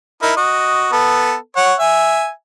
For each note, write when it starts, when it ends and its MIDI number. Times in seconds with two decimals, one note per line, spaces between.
0.23 0.34 63
0.23 0.34 64
0.23 0.34 70
0.37 0.91 66
0.37 0.91 75
0.92 1.35 59
0.92 1.35 69
1.57 1.74 73
1.57 1.74 78
1.80 2.30 76
1.80 2.30 80